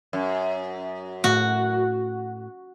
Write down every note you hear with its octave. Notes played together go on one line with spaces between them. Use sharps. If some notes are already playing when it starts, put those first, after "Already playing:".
F#2
A2 F#4